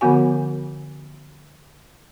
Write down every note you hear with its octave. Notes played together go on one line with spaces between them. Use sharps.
D3 F3 B3 F#4 G#5